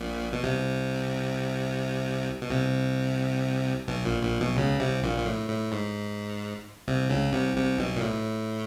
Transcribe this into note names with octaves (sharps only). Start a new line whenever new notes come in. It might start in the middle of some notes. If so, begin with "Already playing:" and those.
Already playing: A#1 A#2
B2
C2 C3
B2
C2 C3
B1 B2
A#1 A#2
A#1 A#2
B1 B2
C#2 C#3
C2 C3
A#1 A#2
A#2
A2
A2
G#2
C2 C3
C#2 C#3
C2 C3
C2 C3
B1 B2
A#2
A2